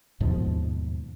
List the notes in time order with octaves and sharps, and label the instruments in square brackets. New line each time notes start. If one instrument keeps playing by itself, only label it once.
[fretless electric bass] D#2 G#2 B2 F3